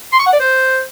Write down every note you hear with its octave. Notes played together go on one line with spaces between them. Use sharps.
C6
C#6
F#5
D5
C5